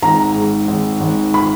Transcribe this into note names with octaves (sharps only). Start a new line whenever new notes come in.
G#1 A#5
G#2
G#1
G#1
B5